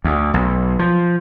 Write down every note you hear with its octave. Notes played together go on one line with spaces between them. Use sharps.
D2
B1
F3